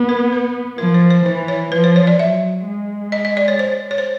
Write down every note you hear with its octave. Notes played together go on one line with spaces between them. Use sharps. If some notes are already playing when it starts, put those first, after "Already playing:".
Already playing: B3
A#4
B4
F3 A#4
C5
C5
E3 C5
C#5
F3 B4
C5
C#5
D5
F#3 E5
G#3
D#5
D#5
D5
C#5
C5
C#5
C5